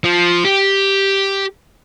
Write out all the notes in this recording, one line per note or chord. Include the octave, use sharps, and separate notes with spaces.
F3
G4